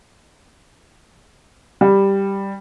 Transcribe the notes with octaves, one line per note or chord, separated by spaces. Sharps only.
G3